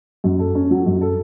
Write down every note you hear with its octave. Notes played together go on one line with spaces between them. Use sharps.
F#2
A4
C#4
F#3
F#2
A4